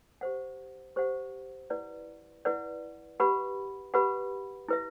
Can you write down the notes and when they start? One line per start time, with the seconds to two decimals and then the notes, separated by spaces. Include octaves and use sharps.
0.21 G4 C5 F#5
0.96 G4 C5 F#5
1.70 E4 B4 D5 F#5
2.45 E4 B4 D5 F#5
3.20 G4 B4 F#5 B5
3.94 G4 B4 F#5 B5
4.69 E4 B4 E5